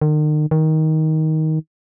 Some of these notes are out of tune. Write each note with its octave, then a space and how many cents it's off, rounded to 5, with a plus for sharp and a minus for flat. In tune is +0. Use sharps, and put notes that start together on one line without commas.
D#3 -40
D#3 +15